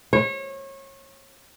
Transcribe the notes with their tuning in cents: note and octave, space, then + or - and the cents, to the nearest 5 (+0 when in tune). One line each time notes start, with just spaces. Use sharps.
C#5 -30